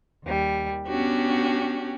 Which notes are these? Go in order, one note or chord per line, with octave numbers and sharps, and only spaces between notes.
D#2 G3
B3 C#4 D4 F#4 G4